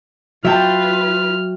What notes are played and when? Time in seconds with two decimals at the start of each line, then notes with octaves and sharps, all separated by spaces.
0.45 F#3 F4 B4 E5 G5 A5 F6